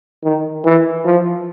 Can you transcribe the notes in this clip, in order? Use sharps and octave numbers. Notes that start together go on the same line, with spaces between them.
D#3
E3
F3